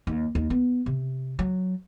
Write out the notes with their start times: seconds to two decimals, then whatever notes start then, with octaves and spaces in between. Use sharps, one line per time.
0.07 D#2
0.35 D#2
0.50 B3
0.86 C3
1.39 F#3